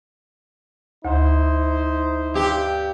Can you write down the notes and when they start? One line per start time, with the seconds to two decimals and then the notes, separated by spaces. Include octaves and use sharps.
1.05 D2 D#4 E4 C5
2.34 G2 G4